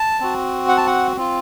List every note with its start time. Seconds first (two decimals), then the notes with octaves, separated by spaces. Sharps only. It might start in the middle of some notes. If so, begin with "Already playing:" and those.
Already playing: A5
0.20 C4 F#4
0.68 F#5
0.77 A5
0.86 F#5
1.16 C4 F4